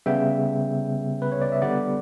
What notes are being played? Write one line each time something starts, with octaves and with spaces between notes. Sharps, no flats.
C#3 G3 B3 E5 G5
B4
C#5
D5
E5
D3 G3 B3 D5 F#5